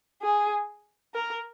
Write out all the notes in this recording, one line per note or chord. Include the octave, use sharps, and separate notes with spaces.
G#4
A#4